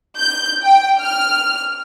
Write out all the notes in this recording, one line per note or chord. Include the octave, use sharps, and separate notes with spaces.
G6
G5
F6